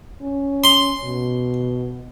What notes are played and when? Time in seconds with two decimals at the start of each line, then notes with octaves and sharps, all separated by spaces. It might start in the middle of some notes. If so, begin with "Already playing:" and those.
0.22 C#4
0.64 C6
1.04 B2